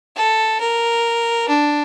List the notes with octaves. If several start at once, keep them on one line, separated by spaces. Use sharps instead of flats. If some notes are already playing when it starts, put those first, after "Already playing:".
A4
A#4
D4